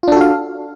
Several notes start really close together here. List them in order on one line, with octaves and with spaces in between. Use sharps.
F4 D4 A4 F#4 F5